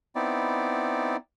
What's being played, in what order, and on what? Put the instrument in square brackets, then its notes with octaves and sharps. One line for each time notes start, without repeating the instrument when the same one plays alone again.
[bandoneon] B3 C4 D#4 E4 D5